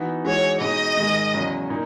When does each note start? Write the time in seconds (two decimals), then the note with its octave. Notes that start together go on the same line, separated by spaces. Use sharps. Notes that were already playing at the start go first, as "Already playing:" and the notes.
Already playing: E3 B3 D#4 F#4
0.24 E3 G#3 D#4 F#4 C#5
0.61 B2 G#3 D#4 D#5
0.97 G#2 D#3 G#3
1.33 E2 C#3 F#3 C#4
1.69 A#2 A#3 D#4